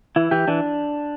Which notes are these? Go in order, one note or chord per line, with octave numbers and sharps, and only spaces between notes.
E3 E4
E3 G4
E3 D4